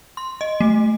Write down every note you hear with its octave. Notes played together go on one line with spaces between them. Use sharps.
C6
D#5
A3